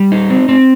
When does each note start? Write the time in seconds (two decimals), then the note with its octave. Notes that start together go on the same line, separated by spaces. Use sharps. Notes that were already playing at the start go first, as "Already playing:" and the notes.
Already playing: G3
0.12 D#4
0.30 C4
0.49 C4